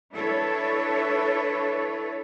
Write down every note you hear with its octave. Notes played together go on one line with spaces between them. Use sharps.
D4 E4 A4 B4 C#5